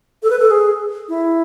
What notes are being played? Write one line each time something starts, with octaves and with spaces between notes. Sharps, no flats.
A4
B4
A4
G#4
E4